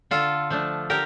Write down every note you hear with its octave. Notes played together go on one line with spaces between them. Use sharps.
D3 F4 A4
F3 A3 D4
D3 G4 A#4